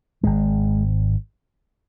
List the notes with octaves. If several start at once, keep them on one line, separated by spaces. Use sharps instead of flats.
G#1 G#2 G#3